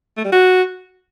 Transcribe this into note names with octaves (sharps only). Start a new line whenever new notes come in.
A3
G3
F#4